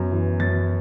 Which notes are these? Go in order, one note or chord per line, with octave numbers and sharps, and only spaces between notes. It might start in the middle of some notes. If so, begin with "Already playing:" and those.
Already playing: F#2 B3
E3
F#2 A6